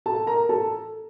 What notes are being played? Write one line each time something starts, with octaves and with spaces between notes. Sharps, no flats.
A4 A5
A#4 A#5
A4 A5